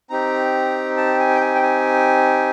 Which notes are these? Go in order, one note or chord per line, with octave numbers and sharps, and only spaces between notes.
C4 D#4 G4 A#5
A5
G#5
G5
G#5
G5
G#5